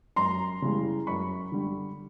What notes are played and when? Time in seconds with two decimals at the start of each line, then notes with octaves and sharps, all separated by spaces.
0.16 F#2 A#5 C6
0.62 C#3 E3 G3
1.07 F#2 B5 C#6
1.52 D3 G3